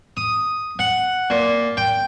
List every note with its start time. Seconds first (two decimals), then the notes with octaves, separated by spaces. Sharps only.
0.17 D#6
0.79 F#5
1.30 A#2
1.77 G5